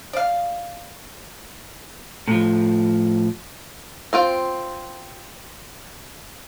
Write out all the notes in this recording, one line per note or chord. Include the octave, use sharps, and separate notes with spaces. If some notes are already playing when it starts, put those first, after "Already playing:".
D5 F5
A2 F3
C4 F4 G5